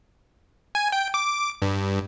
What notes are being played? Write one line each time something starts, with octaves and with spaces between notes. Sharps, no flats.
G#5
G5
D6
G2